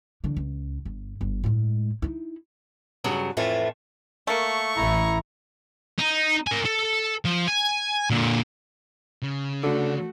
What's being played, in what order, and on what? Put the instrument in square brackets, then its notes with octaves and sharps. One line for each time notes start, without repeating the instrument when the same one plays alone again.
[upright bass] D3 E3
C#2
G1
G1
A2 G#3
D#4 E4
[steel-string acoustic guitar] G2 C#3 F#3
F2 A2 E3 A3 F4
[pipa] A3 A#3 [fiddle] C#6
[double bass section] A1 [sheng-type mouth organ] E4 A#5
[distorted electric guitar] D#4
A#4 G#5
A4
F3
G#5
A#2 D3
C#3
[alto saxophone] D3 [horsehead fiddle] A3 F#4